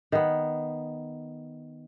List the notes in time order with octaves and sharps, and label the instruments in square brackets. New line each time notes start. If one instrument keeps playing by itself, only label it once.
[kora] D#3 B3